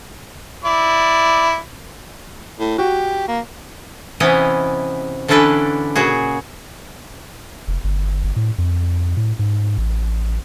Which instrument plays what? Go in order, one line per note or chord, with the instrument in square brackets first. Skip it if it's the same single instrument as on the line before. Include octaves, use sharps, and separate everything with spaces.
[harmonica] E4 D5
[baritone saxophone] A2
[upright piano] F#4 [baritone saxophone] G4
[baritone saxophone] A#3
[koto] C3 E3 B3 C#4 D#5
D3 E3 C#4 D4 A4 B4
A#2 C#3 F#4 G#4
[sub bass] F1
G1
G1
A2
F2
A2
G#2
A1